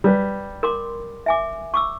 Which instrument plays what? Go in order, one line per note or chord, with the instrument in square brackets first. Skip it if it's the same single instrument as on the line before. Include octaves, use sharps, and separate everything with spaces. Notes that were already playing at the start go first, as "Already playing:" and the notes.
[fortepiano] G3 B4
[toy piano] A#4 C6 D6
E5 G#5 D6
C#6 D6 E6